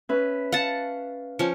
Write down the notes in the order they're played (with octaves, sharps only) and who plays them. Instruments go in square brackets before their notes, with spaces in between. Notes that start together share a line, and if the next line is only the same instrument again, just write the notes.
[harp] C#4 B4 E5
[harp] F5 [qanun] F#5 A5
[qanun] F3 C#4